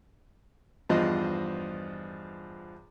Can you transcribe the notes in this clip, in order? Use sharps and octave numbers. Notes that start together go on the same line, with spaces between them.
E2 G2 F3 C5 D#5